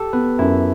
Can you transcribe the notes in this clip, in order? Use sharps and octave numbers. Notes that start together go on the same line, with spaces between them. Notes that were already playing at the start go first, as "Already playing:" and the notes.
Already playing: G4 A4
B3 B4
F#2 E4